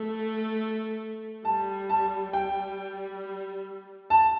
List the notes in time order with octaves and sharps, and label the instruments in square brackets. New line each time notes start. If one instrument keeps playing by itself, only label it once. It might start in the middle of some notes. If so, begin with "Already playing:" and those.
Already playing: [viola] A3
[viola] G3 [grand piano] A5
[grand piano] A5
[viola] G3 [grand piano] G5
[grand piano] A5